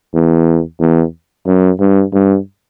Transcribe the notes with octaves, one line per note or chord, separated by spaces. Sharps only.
E2
E2
F#2
G2
G2